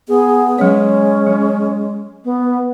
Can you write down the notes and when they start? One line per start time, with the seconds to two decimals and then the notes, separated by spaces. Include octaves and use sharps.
0.08 B3 G#4
0.59 F#3 G#3 C#4 C#5
1.27 F#3
2.25 B3